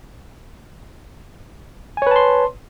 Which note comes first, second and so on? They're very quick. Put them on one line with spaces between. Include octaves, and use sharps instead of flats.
G#5 C#5 B4 A5 C6